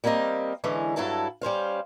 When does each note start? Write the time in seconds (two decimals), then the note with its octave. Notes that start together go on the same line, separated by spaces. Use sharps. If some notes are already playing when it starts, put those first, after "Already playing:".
0.04 G3 A#3 C4 A#4 D#5
0.64 D3 E3 G#3 C#4
0.96 G2 F#3 E4 A4 A5
1.41 G3 C#4 C5 F5